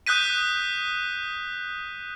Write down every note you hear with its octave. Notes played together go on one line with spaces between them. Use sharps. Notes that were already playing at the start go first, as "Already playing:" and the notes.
D#6 F#6 G6 B6 D#7